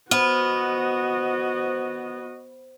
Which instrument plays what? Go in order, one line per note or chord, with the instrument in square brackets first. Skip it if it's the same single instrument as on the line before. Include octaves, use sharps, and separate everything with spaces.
[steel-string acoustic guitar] B3 [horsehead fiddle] F#4 D#5 [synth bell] C5